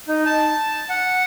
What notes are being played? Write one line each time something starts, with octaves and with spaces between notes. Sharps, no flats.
D#4
A5
F#5